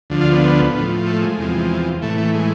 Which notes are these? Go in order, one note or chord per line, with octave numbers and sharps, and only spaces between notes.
D2 D3 F3
F4
B3
A2 F3
A3
G#3
E2 C3 F3
A2 E3 A3
A3
G#3